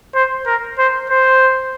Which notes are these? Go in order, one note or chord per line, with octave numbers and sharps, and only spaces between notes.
C5
A#4
C5
C5